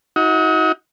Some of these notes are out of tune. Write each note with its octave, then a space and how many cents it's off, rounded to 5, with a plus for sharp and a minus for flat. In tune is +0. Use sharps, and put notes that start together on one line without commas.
D#4 +40 F#4 -15